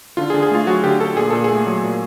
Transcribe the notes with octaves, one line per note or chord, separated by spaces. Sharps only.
D3 F4
G#4
D3
G#4
A3 F4
F#3 F#4
D3 G4
D3 A4
A#2 G#4
A#2 A4
G#4
A3
F#3
A#2